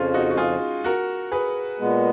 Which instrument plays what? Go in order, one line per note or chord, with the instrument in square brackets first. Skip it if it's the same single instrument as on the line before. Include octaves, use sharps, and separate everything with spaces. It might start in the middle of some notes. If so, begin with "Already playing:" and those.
Already playing: [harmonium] F2 C#3 F3 [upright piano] C#4 F4
[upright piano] D#4 F#4
F#4
F4 G#4
F#4 A#4
G#4 B4
[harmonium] A#2 G#3 B3